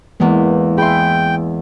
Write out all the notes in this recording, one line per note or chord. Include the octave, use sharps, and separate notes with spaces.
E2 G#2 E3 G#3 A#3
G#4 E5 G5 B5 C6